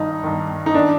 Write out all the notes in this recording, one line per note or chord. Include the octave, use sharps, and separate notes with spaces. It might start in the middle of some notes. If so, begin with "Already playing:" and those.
Already playing: G2 D#3 D#4
G2 D#3
D#4
D#3 D4